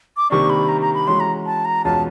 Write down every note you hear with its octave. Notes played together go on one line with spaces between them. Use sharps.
D6
C3 D#3 G3 A#3 D4 C#6
B5
A#5
A#5
B5
E3 G#3 C#4 F#4 C6
A#5
A5
A#5
E2 B2 G#3 C#4 F4 A5